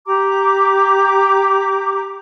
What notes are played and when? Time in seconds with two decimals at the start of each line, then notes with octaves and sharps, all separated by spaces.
0.06 G4 A#5 D6